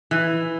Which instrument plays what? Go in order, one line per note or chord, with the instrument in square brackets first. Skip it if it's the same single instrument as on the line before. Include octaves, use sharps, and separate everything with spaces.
[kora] E3